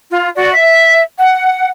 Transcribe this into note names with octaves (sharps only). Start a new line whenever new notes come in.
F4
F#4 D5
E5
F#5